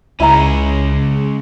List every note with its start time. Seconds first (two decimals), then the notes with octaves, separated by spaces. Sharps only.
0.20 C#2 C#3 G#3 C#4 E4 E5 A#5